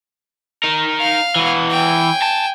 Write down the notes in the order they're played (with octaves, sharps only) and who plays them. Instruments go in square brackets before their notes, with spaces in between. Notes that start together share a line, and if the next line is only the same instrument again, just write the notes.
[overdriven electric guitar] D#4 A#4
[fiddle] F5
[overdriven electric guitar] E3 F#4
[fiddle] G5 G#5
[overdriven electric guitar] A5